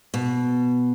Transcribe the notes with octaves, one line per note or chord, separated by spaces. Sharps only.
B2